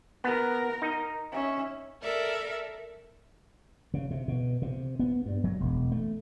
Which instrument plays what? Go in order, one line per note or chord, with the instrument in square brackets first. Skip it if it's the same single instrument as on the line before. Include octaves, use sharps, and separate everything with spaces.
[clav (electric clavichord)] B3 [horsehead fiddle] A#4
[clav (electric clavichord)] D#4
[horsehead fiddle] C#4 E5
[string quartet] A4 A#4 D5 E5
[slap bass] C#3
C3
B2
C3
B3
G2
F#3
E1
A3